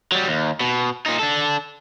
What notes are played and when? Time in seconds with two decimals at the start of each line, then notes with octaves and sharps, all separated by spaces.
0.12 F#3 G3
0.28 D#2
0.61 B2
1.06 A#2 D#4
1.19 D4 A4